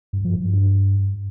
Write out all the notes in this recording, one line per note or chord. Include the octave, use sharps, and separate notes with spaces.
G2
F3
G2